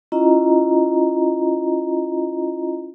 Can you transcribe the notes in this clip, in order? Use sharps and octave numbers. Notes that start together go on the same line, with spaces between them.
C#4 E4 F4 D#5 A#5